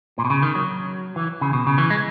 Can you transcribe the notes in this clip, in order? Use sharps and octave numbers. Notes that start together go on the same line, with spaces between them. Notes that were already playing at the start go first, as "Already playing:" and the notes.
A#2
B2
C#3
D#3
F#3
E3
C#3
B2
C#3
E3
G#3